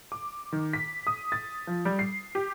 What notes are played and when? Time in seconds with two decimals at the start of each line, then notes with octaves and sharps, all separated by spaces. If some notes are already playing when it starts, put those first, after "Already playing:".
0.12 D6
0.53 D#3
0.73 B6
1.07 D#6
1.32 A6
1.67 F3
1.85 G3
1.99 C7
2.35 G4